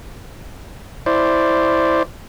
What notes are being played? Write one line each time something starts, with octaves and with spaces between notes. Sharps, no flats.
E4 C5 D5